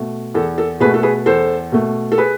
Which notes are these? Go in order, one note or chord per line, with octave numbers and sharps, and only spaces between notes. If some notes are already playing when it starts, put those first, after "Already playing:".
Already playing: B2 A3
E2 A4
A4
B2 A3 G#4 B4
A4
G#4 B4
E2 A4 C5
B2 A3
A4
G#4 B4